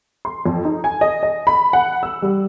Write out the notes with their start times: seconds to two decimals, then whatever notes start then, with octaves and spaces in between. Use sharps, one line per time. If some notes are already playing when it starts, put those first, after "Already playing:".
0.25 C6
0.46 F2
0.65 D#4
0.84 G#5
1.01 D#5
1.23 D#5
1.47 B5
1.73 F#5
2.03 E6
2.22 G3